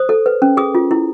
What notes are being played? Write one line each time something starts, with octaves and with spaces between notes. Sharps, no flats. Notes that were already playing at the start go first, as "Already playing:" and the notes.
Already playing: C5 D#6
A4
B4
C#4
G#4 D#6
F4
E4